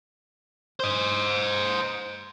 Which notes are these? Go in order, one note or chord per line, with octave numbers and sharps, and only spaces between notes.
C5 D#5